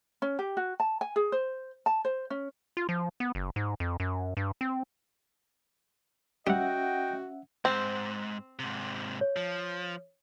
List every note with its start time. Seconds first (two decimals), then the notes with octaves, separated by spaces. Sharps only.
0.22 C#4
0.39 G4
0.57 F#4
0.80 A5
1.01 G#5
1.16 G#4
1.32 C5
1.86 A5
2.05 C5
2.30 C#4
2.77 F4
2.89 F3
3.20 B3
3.35 F#1
3.56 G#2
3.80 F2
4.00 F#2
4.37 G2
4.61 C4
6.47 G3 C#4 F#4 D#5 E5 F#5 G5
7.65 D2 G#2 C4
8.59 G#2 C3
9.21 C#5
9.36 F3